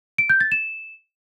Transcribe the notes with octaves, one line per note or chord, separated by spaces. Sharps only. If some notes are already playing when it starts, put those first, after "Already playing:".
D7
G6
A6
E7